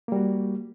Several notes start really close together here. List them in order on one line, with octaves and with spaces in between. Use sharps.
A#3 G3 F#4